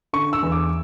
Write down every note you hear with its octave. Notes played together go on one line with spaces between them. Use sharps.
D3 C#6
E6
E2
D6